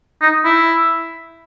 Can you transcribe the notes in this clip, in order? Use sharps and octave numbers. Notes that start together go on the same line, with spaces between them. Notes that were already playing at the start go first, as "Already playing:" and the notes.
D#4
E4